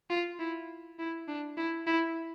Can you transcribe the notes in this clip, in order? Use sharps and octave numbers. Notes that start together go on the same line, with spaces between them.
F4
E4
E4
D4
E4
E4